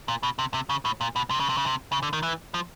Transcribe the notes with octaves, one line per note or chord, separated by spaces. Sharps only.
A#2
B2
C3
C3
C#3
A2
A#2
B2
C3
C#3
C3
C#3
C3
C#3
D3
D#3
E3
F3